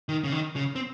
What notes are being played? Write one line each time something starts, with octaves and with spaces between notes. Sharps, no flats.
D#3
C#3
D#3
C#3
C4